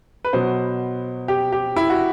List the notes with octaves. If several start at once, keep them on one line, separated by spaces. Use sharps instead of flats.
B4
B2 F#3 C5
G4
G4
E4
F#4